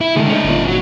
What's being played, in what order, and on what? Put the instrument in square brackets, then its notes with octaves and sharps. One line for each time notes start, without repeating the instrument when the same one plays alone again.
[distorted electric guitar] E4
[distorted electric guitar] D3 D#3 [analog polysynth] G#3 A3
[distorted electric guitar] C#4 D#4
[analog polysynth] G1 A#2
[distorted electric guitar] F#3